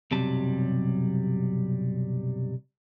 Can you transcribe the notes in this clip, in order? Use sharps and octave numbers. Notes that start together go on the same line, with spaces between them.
B1 F#2 C3 F#3 G3 A5